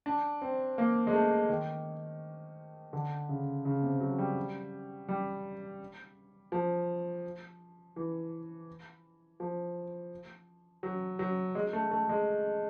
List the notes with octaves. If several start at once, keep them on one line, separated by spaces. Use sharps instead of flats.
D4
C4
A#3
G#3
A3
D#3
D3
C#3
C#3
C3
F#3
G3
G3
F3
E3
F3
F#3
F#3
G#3
A3
A3
G#3